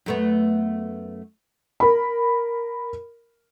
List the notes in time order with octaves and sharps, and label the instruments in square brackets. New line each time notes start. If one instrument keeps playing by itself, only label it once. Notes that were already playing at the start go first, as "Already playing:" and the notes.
[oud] F#2 A3 B3
[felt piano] A#4 B5